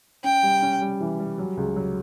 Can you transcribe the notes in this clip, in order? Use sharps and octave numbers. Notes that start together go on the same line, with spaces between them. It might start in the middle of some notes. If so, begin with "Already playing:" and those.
C#4 G5
G3
C#4
G3
E3
G3
F#3
C#2
F#3